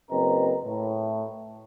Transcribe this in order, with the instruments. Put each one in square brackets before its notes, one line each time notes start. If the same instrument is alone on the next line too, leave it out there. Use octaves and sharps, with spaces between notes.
[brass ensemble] F#1 C4 A#4 B4 D#5 A#5
A2